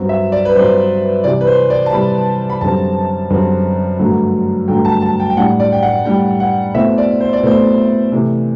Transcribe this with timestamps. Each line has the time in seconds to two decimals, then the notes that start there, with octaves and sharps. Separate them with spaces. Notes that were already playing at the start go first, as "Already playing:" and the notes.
Already playing: G2 F#3 C4
0.09 E5
0.32 D5
0.45 B4
0.55 G2 F#3 C4 C5
1.24 C3 E3 G3 D5
1.41 B4
1.47 C5
1.70 D5
1.86 A5
1.93 C3 E3 G3 B5
2.50 B5
2.61 F#2 D3 G3 C4 A5
3.30 F#2 D3 G3 C4
3.99 G2 D3 F#3 A3
4.68 G2 D3 F#3 A3 G5
4.85 A5
5.02 A5
5.20 G5
5.30 G5
5.37 A2 G3 D4 F#5
5.60 D5
5.73 G5
5.83 F#5
6.05 A2 G3 D4 G5
6.40 F#5
6.75 B2 A3 C4 E4 E5
6.98 D5
7.20 C5
7.33 D5
7.43 B2 A3 C4 E4 C5
8.12 C3 E3 A3